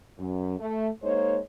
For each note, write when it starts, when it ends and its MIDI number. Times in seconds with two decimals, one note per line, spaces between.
0.18 0.56 42
0.59 0.89 57
1.03 1.39 56
1.03 1.39 58
1.03 1.39 63
1.03 1.39 72
1.03 1.39 73